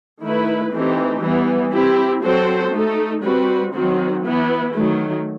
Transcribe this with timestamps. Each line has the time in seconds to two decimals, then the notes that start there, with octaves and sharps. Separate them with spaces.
0.22 D#3 A3 E4 B4
0.72 E3 A3 C4 D#4 G4
1.22 E3 G3 B3
1.73 C4 E4 G4
2.23 F#3 C4 F#4 A4 C5
2.73 A3 D#4 A4
3.23 G3 C4 F#4 B4
3.74 D#3 F#3 C4 F#4
4.24 E3 B3 E4
4.74 D#3 F#3 A3